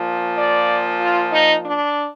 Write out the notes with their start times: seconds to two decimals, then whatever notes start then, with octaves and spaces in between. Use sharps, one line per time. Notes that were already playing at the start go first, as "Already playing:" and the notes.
Already playing: A#2 F3
0.38 D5
1.00 F4
1.31 D#4
1.63 D4